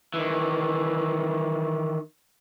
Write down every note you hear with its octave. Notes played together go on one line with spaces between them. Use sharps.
D#3 E3